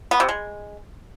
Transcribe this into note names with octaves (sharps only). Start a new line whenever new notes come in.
B3
C3
G#3